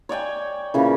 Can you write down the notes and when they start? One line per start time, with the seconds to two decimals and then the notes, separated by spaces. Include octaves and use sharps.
0.09 C#5 D5 G5 G#5
0.74 A#2 C#3 E3